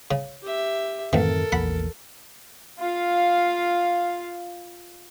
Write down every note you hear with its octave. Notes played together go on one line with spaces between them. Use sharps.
C#3
G4 E5
A1 F#2 D#3 E3 C4 A4 A#4
A#1 E2 A#2 F#5 B5
F4 F5